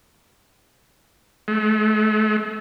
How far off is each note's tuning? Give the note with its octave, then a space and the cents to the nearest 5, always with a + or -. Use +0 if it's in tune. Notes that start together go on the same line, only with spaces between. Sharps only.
A3 -40